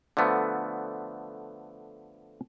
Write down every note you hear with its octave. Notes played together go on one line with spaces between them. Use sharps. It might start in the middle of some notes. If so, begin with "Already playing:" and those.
D3 F3 A3 B3